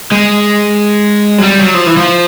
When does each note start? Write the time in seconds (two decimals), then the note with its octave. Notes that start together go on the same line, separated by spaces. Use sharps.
0.12 G#3
1.38 F#3
1.43 G3
1.59 F#3
1.74 F3
1.86 E3
1.97 F3